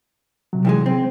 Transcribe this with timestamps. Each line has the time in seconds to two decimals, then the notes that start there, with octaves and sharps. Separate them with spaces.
0.53 C3 F#3
0.65 C2 E3 G#3
0.86 C4